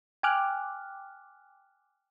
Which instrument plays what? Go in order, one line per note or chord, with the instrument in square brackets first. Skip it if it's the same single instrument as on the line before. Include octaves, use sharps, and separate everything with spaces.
[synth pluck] G5 G#5 D6 F6 F#6